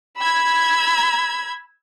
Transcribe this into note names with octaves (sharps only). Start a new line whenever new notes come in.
B5 E6 G#6